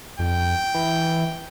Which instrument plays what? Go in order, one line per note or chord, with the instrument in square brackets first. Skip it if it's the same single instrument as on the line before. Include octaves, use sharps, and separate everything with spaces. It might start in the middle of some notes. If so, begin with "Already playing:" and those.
[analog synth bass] F2 [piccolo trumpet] G5
[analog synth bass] E3